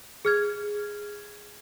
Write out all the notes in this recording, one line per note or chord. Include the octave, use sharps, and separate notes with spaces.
G#4 F6 G#6